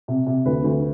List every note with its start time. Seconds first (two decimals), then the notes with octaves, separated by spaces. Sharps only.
0.08 C3
0.27 C3
0.46 D2 B4
0.64 D2